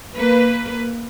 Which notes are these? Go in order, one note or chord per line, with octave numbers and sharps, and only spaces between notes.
A#3 B4